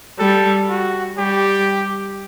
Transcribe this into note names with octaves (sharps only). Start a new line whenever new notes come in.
G3 A4
F#4
G3 G4